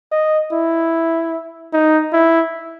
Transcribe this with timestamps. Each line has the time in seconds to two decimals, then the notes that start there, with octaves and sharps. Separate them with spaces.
0.12 D#5
0.52 E4
1.73 D#4
2.13 E4